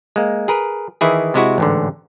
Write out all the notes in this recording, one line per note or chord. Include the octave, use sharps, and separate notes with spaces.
G#3 A#3
G#4 A#4 B4
D#3 E3 E4 G#4
C3 G#3 E4 F#4
A1 G#2 D3